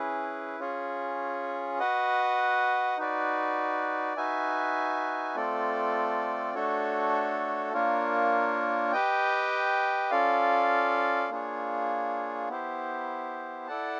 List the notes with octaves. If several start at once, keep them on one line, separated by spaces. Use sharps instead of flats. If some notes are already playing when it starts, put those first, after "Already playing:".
Already playing: C#4 E4 G#4 B4
C#4 F4 G#4 C#5
F#4 B4 D#5 F#5
D#4 F#4 B4 D5
D#4 F#4 B4 E5 G#5
A3 C4 F4 A4 D5
A3 D4 F#4 A4 C#5
A#3 D4 F4 A#4 C#5
G4 B4 D#5 G5
C#4 F4 A4 D5 F5
A#3 D4 F4 G#4 C#5
B3 E4 G4 C5
E4 A4 D5 F#5 A5